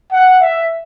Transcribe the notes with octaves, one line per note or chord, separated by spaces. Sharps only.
F#5
E5